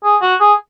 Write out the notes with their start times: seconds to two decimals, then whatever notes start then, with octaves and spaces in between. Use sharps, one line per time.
0.04 G#4
0.22 F#4
0.40 G#4